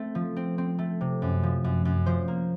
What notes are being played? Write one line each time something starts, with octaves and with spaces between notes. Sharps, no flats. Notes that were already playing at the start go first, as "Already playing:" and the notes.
Already playing: A3 C4
F3
C4
C4
A3
C3
F#2
F3
F#2
F#2
F3 C5
A#3